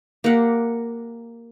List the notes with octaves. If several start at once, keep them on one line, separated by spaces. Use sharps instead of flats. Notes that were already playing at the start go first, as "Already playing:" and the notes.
A#3 G4 F#5